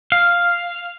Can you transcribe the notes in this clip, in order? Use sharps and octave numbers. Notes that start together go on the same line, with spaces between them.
F5